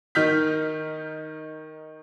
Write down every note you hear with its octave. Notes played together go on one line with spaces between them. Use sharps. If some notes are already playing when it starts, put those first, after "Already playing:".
D#3 D#4 F6 G6 B6